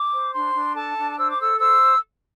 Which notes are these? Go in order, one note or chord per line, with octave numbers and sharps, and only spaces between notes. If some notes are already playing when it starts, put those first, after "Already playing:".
Already playing: D6
C5
D4 C6
D4
A4 A5
D4
C5 E6
D6
A4 E6
C5 E6